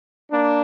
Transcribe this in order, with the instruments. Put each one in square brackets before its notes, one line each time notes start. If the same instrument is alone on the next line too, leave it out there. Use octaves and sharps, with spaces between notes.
[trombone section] A#3 D4